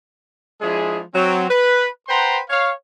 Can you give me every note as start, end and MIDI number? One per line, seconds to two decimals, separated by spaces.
0.61 1.00 53
0.61 1.00 56
0.61 1.00 62
0.61 1.00 64
0.61 1.00 68
1.15 1.49 54
1.15 1.49 60
1.49 1.86 71
2.08 2.39 71
2.08 2.39 72
2.08 2.39 78
2.08 2.39 79
2.08 2.39 82
2.08 2.39 84
2.50 2.71 73
2.50 2.71 77